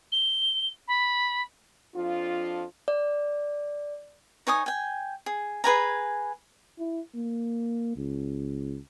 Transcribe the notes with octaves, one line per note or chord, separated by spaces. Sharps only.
G7
B5
F2 F3 D4 F4
D5
D#4 C#5 G#5 D#6
G5 G#5
G#4
G#4 B4 G#5 A#5
E4
A#3
C#2